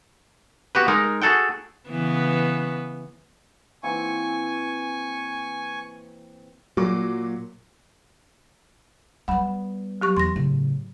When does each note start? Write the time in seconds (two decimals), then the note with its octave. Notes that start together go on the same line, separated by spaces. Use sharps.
0.75 B3 F#4 G4 B4
0.88 G#3 D#4 A#4
1.22 F#4 G#4 A4 F#5 G5
1.89 C#3 E3 B3
3.83 E3 A#3 C4 G#5 C#6
6.77 A#2 F#3 D6
9.28 G3 B3 F#5 B5
10.01 F#3 G4 C#6
10.17 E2 C6 A#6
10.36 A2 C#3